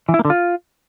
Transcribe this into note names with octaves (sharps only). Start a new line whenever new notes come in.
E3
E4
A#3
D3
F4